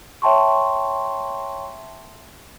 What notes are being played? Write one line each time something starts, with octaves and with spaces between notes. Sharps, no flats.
C#5 E5 G5 A5 C6 C#6